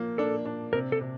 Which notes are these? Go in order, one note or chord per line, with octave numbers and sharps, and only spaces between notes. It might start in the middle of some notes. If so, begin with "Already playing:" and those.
Already playing: F3 A#3
D4 A4
D4
C3 A#4
A4
C3